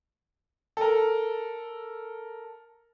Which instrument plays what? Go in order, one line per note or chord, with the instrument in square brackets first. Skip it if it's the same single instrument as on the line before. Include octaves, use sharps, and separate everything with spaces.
[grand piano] A4 A#4